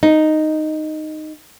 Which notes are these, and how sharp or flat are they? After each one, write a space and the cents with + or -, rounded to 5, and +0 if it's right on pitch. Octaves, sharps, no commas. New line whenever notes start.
D#4 -5